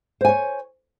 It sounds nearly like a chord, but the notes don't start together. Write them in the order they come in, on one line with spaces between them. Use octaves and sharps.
C5 G#5 C#5